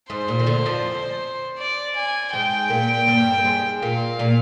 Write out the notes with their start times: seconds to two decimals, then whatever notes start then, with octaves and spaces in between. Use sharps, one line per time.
0.10 G#2 C5
0.28 A#2
0.39 D#3
0.46 D2 D3
0.66 F2 F3
1.59 D5
1.96 G#5
2.33 G#2 G#3 G5
2.70 A#2 A#3
3.07 G2 G3
3.31 C4
3.38 A#3
3.44 G#2 G#3
3.82 A#2 A#3 F5
4.19 A#2 A#3